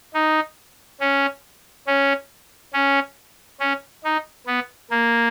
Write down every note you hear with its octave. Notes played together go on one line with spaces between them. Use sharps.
D#4
C#4
C#4
C#4
C#4
D#4
B3
A#3